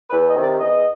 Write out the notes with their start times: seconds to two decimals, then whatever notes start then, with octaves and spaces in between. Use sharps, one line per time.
0.10 E2 B4
0.27 D#5
0.35 C3 D#3
0.42 D5
0.59 E2 D#5